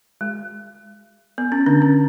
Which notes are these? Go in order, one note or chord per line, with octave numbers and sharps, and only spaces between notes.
G#3
B3
C#4
D3 D4
C#4